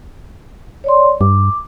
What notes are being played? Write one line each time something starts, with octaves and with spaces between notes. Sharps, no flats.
C#5 D5 C6
G2 D6